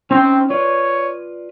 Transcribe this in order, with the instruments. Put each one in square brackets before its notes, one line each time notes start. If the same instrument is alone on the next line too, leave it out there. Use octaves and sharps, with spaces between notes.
[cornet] C4 [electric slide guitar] C#4 D#4 G5
[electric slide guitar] F4 B4 D5 [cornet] C#5